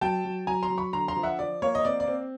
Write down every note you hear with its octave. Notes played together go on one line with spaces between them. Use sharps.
F#3 G5 A5
F#3
F#3 G#5 A#5
A#5 C6
F#3
B5 C#6
D3 A#5 C6
A#5 C6
F3
E5 F#5
F3 D5
A#3 C#5
D#5
C4 D5
D5
C4